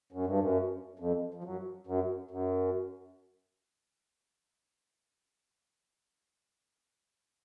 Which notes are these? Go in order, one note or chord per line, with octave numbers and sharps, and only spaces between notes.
F#2
G2
F#2
F2
F2
F#2
F#2
F#2